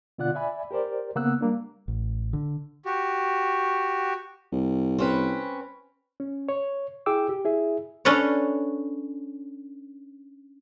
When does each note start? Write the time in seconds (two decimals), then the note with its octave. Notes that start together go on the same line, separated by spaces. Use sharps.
0.18 B2 D3 F4 D5 F#5 F#6
0.35 D5 E5 G#5 B5
0.71 G4 A#4 C5 D5
1.16 C#3 A#3 B3 F#5 E6 F#6
1.41 G3 A#3 D4
1.88 A1
2.33 D3
2.85 F#4 G4
4.52 C2
4.98 C4 C#4 B4
6.20 C#4
6.49 C#5
7.06 E4 G#4 G5 D6 E6
7.29 G4
7.45 E4 G#4 E5
8.05 C#4 D4 A4 B4 C#5